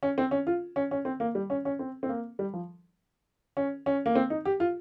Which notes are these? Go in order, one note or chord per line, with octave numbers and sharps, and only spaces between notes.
C#4
C4
C#4
F4
C#4
C#4
C4
A#3
G3
C#4
C#4
C4
C4
A#3
G3
F3
C#4
C#4
A#3
C4
D#4
G4
F4